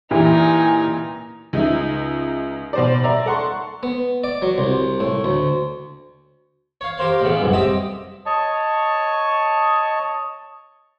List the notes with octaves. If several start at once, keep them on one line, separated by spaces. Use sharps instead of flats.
A#2 E3 D#4 E4 G4 G#5
C#2 D#4 E5
B2 C5 D5
D5 E5 A#5
A4 F#5 C6 C#6
B3
D5
F#3
C2
A2
D2
C#5 F5
G4 A#4 C5 F5
A1 C#3 B3
C2 F#2
C4 G4 D#5 E5 G5
C#5 D#5 A5 C#6